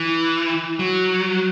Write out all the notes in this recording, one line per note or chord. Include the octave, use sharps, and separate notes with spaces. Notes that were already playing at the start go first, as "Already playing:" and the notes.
Already playing: E3
F#3